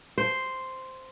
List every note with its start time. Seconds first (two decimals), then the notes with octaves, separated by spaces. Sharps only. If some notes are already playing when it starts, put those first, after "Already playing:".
0.18 C5